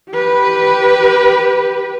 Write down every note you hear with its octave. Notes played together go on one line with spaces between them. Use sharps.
G4 B4